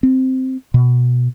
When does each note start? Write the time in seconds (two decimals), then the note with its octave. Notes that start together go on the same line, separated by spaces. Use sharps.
0.03 C4
0.74 B2